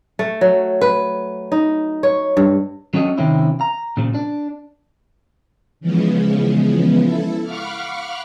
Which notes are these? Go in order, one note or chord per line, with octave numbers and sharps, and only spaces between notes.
A3
F#3
B4
D#4
C#5
G2
F#3 C#4 D4 F#4 A4 D#5
C3 D#3 F3 C4 C#4 E4
A#5
A#2 C#3 F3
D4
C#3 E3 F3 G#3 B3
E4 A4
F5 F#5 B5 C#6 D6 F6